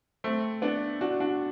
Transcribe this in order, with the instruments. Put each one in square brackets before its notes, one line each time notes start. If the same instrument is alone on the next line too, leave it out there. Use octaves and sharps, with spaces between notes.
[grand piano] A3 C4
B3 D4
D4 F#4
D4 F#4